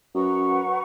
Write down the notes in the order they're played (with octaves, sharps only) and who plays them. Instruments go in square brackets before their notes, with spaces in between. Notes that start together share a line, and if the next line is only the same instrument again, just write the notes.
[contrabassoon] F#2 [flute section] B4 F#5 A#5 C#6